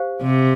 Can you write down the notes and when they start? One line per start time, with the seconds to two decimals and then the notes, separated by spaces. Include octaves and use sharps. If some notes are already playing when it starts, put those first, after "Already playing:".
Already playing: G4 C5 F5
0.22 C3